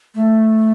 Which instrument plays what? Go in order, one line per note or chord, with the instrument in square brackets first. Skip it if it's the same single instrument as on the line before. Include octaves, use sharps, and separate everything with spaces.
[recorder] A3